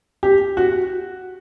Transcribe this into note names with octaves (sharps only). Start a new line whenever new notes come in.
G4
F#4